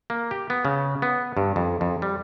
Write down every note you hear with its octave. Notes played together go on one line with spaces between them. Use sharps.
A#3
G4
B3
C#3
B3
G2
F2
F2
G3